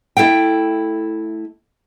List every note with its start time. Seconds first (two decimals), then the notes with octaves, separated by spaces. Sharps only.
0.17 A3 E4 A4 F5 G5